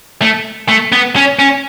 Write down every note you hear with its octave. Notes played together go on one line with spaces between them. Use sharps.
A3
A3
B3
C#4
C#4